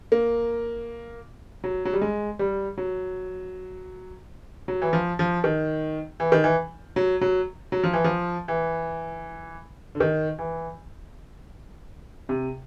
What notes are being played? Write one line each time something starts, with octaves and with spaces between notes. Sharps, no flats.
A#3
F#3
F#3
G3
G#3
G3
F#3
F#3
E3
F3
F3
D#3
E3
D#3
E3
F#3
F#3
F#3
F3
E3
F3
E3
D3
D#3
E3
C3